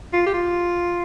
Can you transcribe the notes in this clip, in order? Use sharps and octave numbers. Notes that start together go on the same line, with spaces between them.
F4
G4
F4